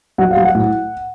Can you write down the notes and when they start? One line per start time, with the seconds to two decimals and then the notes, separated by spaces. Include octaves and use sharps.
0.18 F#3 F#5
0.31 F5
0.37 F#3
0.44 F#5
0.54 A2